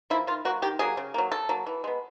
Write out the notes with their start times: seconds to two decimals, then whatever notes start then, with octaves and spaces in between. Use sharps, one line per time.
0.10 F3 A#3 E4
0.27 D#3 F4
0.45 F#3 A#3 F#4
0.62 D#3 G4
0.79 F#3 A#3 G#4
0.97 C#3
1.14 F#3 A#3
1.31 C#3 A4
1.49 F#3 A#3
1.66 E3
1.84 G#3 B3